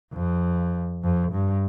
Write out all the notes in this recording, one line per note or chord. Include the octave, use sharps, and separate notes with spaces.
F2
F2
G2